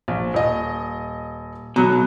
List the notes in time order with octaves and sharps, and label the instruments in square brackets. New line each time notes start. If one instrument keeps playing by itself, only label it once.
[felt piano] A#1
D#1 D#5
[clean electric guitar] B2 F#3 [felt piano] A#5